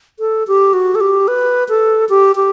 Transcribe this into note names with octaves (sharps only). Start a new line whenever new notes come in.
A4
G4
F#4
A4
G4
B4
A4
G4
G4